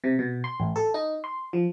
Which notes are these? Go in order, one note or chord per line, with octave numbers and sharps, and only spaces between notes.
C3
B2
C6
A1
A4
D#4
C6
F3